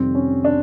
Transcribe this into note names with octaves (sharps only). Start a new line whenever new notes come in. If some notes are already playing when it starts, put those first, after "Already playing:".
Already playing: F2 C3 D#3 G3 C4
C#4
D4